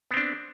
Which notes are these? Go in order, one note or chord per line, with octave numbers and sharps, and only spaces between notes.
B3 C4 D4